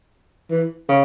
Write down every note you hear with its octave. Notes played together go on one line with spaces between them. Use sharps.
E3
C#3